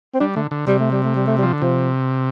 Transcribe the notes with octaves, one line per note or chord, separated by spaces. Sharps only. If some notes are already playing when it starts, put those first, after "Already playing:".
C4
G3 D4
D3 A3
D3
C3 G3
A3
G3
A3
G3
A3
G3
F3
D3
C3 F3